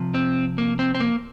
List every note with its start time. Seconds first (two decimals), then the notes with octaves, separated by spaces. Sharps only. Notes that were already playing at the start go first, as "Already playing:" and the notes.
Already playing: C3 F3
0.15 C4
0.58 A#3
0.79 C4
0.95 C4
1.00 A#3